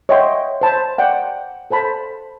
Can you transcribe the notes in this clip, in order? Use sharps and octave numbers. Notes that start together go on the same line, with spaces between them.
C#5 D#5 E5 F#5 G5 C6
C5 A5 B5
D5 F#5 G5
A4 C5 A5 B5